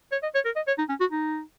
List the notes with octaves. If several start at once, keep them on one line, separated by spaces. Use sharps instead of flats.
C#5
D#5
C#5
A#4
D#5
C#5
D#4
C#4
F#4
D#4